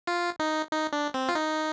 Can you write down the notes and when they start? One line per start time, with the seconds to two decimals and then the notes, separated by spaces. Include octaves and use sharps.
0.07 F4
0.40 D#4
0.72 D#4
0.93 D4
1.14 C4
1.29 F4
1.35 D#4